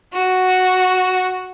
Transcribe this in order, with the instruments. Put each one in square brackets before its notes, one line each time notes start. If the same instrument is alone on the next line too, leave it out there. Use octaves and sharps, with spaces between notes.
[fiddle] F#4